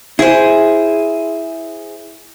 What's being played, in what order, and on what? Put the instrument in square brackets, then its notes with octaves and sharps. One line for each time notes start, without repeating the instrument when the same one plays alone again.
[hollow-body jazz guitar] E4 [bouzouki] G#4 C5